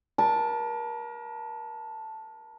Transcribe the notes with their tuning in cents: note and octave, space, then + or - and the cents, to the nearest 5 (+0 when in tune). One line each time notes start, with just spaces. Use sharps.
A#4 +35 A5 +0